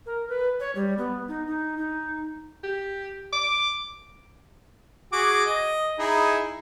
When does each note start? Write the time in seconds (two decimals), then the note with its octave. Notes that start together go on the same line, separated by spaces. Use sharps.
0.06 A#4
0.29 B4
0.60 C#5
0.75 G3
0.98 B3
1.28 D#4
1.47 D#4
1.77 D#4
2.64 G4
3.33 D6
5.12 F#4 G#4 D6
5.46 D#5
5.99 D#4 E4 G#4